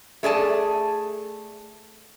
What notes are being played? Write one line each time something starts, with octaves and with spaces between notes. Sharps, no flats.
A3 G#4 D5 A5